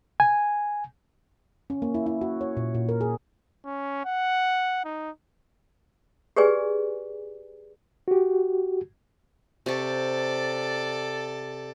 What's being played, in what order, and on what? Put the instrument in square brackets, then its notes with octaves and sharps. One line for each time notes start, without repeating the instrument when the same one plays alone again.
[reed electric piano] G#5
[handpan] C#4
A#3
E4
E4
F#4
C#5
A#2
A#2
A#4
G#4
[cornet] C#4
F#5
D#4
[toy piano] G4 G#4 B4 D5 G#5
[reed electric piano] F#4 G4
[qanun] C3 C#6 [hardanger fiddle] A4 D5